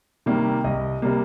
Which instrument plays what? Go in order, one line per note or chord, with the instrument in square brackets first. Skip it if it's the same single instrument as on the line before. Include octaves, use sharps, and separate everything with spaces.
[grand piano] C3 D#3 G3 A#3
C2 D#5
C3 G3 A#3